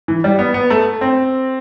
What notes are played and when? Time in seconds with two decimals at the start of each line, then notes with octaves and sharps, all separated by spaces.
0.08 E3
0.24 G3
0.39 B3
0.54 B3
0.70 A3
1.01 C4